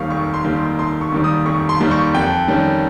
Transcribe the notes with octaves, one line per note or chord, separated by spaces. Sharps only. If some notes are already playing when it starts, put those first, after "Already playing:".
Already playing: F1 D#2 D#3 G3 F5 C#6
F1 C#6
C6
D#2 D#3 G3
C6
F1 C6
C#6
D#2 D#3 G3
D#6
F1 C#6
C6
D#2 D#3 G3
C#6
F2 G5
D#3 G3 C#4